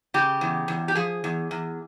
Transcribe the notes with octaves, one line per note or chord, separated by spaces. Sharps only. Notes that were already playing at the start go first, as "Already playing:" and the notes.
C#3 G4
E2
E2
G4
F3 G#4
E2
E2